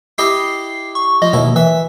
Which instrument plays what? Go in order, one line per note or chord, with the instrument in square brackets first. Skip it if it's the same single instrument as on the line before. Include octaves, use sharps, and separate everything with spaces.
[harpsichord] E4 G4 D#5 [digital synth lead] C7
[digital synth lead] C#6
[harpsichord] F3 [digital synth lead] D#5
[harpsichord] D#2 E4 [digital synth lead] B2
[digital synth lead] E3 [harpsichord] E5